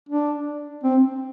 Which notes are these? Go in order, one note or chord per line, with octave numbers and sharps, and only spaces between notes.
D4
C4